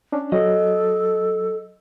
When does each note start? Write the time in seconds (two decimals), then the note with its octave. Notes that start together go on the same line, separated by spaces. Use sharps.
0.12 C#4 D4
0.32 F#3 A4 D#5